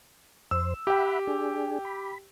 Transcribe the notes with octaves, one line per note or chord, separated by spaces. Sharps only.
F2 C5 E6
G4 E5 F#5 G5 B5
D4 G#4
B5